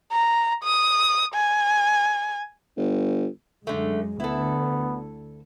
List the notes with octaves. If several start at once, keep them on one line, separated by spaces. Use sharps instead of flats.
A#5
D#6
G#5
G1
F#2 D3 G#3 A3
D2 D3 B3 E4 A4